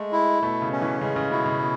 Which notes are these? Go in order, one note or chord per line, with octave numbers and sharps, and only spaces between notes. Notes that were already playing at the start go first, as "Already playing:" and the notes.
Already playing: G#3 A3
E4
B2 A3
C#3
C#4
E3
C#3 G#3
C#3
B2 E4
C#3
B2